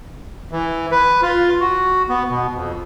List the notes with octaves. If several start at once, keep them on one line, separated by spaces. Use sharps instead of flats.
E3
B4
F4
F#4
B3
B2
F2